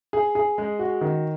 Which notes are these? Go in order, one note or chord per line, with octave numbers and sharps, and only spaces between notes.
G#4
G#4
G#3
F#4
D#3